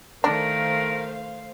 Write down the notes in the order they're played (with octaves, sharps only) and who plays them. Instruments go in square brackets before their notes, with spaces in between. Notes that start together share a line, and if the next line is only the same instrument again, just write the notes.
[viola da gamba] D#3 A3 [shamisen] D4 [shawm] A#4 [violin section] C5 F5